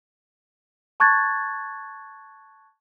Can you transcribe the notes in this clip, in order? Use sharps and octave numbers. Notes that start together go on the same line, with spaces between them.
A5 C#6 F#6 G#6 A6